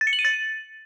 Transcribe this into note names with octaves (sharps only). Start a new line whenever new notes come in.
A6
C#7
F#7
D#7
A6